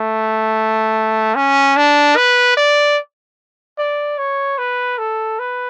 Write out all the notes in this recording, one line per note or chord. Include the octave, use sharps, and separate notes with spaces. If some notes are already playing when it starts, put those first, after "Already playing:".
Already playing: A3
C#4
D4
B4
D5
D5
C#5
B4
A4
B4